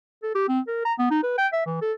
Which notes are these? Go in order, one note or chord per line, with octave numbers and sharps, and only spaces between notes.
A4
G4
C4
A#4
A#5
B3
D#4
B4
G5
E5
E3
A4